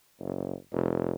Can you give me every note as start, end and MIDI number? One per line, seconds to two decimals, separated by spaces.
0.20 0.54 30
0.72 1.13 29